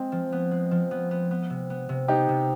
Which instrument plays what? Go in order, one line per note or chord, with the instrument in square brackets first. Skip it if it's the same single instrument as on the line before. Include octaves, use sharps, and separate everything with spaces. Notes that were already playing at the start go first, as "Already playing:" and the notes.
Already playing: [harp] G#3 [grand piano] C4
[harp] F3
B3
G#3
F3
B3
B3
B3
C3
B3
C3
[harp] B3 [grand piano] D#4 G4
[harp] C3